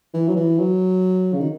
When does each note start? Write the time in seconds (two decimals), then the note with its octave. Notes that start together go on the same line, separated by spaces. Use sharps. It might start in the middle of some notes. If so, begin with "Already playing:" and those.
0.14 E3
0.28 F#3
0.36 E3
0.59 F#3
1.33 C#3
1.41 D#3